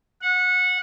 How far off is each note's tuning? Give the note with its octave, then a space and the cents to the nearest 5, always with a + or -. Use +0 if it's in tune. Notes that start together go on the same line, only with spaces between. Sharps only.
F#5 -20